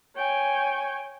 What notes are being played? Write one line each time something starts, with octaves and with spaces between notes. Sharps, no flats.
C#5 G5 G#5